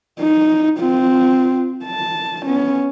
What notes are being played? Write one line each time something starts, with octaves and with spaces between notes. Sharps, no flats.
D#4
C4 F4
A5
B3 C#4